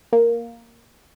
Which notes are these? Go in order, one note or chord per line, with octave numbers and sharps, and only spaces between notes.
A#3